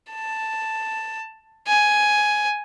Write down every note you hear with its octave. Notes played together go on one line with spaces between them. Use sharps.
A5
G#5